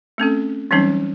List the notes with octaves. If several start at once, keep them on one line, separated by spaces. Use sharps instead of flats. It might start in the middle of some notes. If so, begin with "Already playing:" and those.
A3 C4 C#4 A4
E3 F#3 G3 C4 C#4 D#4